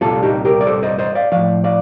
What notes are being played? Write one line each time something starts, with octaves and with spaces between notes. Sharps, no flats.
C2 A#2 G3 F4 A4
D#4 G4
G4 A#4
D5
A4 C5
C5 D#5
C5 D#5
D5 F5
A2 F3 D5 F5
D5 F5